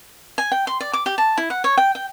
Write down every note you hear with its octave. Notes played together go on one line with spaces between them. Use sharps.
G#5
G5
C6
D5
D6
G4
A5
E4
F#5
C#5
G5
G5